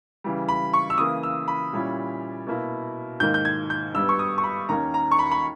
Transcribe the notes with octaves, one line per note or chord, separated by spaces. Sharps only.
C#3 E3 G3
B5
C#6
E6
C#3 E3 A#3 D#6
E6
B5
A#2 G3 C#4 E4
B2 A#3 E4
G#2 D#3 A#3 G6
G6
G#6
G6
G2 G3 B3 E6
C#6
D#6
C#6
B5
D#2 D#3 A#3 C#4 A#5
A#5
C#6
B5
B5